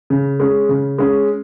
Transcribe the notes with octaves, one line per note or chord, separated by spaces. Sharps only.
C#3
G#3 C#4
C#3
G#3 C#4